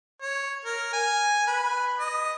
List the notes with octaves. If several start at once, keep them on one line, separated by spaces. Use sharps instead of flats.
C#5
A#4
G#5
B4
D#5